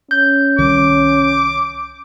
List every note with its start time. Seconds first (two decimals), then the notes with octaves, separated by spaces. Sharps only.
0.11 C#4 G6
0.58 C2 D#3 G3 D6